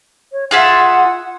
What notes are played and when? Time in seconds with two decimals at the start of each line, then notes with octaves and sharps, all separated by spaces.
0.32 C#5
0.51 F4 G#4 E5 F#5